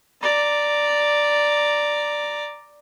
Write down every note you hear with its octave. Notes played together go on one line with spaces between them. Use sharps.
D5 A#5